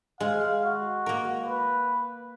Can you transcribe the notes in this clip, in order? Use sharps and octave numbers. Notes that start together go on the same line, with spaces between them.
G#3 F5
F#4
A#3 A#4
B4